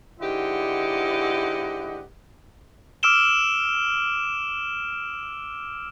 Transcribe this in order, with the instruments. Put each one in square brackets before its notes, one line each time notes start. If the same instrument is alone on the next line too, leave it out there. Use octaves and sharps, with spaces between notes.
[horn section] G#2 D3 E4 G4 D#5 F#5
[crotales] D6 E6 F6 D7 E7 G7